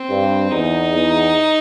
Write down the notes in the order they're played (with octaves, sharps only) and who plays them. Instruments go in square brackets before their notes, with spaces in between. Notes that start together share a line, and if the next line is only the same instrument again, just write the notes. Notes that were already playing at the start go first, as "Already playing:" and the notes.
Already playing: [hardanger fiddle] C4
[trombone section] G2
[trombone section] E2 [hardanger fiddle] D#4
[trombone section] E2